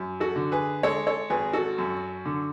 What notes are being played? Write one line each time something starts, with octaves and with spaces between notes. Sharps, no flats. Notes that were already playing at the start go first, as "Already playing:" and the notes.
Already playing: F#2
F#4 A4
D3
G#4 B4
G#3 A4 C#5
A4 C#5
G#1 G#4 B4
F#4 A4
F#2
D3